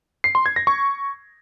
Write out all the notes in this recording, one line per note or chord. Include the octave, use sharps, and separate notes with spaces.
C7
C6
G#6
A#6
C#6